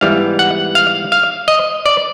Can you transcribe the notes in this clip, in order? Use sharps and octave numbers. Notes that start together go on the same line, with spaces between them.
G#2 E3 G3 B3 F5
F#5
F5
F5
D#5
D5